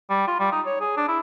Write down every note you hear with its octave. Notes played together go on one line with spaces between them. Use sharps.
G3
F4
G3
D#4
C#5
G#4
D4
E4